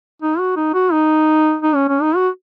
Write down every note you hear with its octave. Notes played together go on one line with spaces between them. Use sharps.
D#4
F#4
D#4
F#4
D#4
D#4
C#4
C#4
D#4
F#4